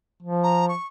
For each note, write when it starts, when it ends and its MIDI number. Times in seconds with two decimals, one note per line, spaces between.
0.23 0.73 53
0.44 0.66 82
0.69 0.87 85